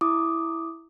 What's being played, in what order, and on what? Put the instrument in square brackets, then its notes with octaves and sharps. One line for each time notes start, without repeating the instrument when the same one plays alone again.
[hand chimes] E4 D6 D#6